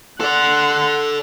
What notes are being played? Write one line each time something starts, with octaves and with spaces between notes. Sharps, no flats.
A4 D5 F#5 C6